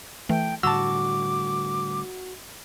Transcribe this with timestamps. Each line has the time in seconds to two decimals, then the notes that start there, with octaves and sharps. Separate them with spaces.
0.29 E3 A3 G5
0.63 A2 D3 G3 F#4 A5 D6 E6